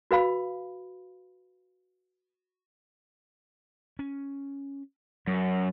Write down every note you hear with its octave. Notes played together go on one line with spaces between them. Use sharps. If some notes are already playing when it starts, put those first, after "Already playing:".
F#4 B4 F5 B5
C#4
F#2 F#3